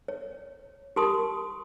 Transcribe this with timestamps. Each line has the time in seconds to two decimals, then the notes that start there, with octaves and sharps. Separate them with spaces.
0.08 C#5
0.96 G4 A#4 A5 C6 D#6